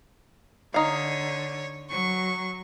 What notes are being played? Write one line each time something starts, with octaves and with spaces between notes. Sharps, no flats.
D3 D#4 C#5 F5
F#3 C#6